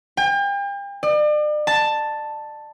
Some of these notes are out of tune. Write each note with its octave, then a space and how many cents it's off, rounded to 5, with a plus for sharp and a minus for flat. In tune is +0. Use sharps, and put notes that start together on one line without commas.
G5 +40
D5 +40
A5 +5